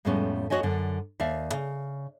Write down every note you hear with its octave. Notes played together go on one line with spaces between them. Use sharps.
F2 A2 G3 G#3 B3 C#4
F2 F3 F#4 C#5 D#5 G#5
F#2 D3
D#2 D5 E5 F5
C#3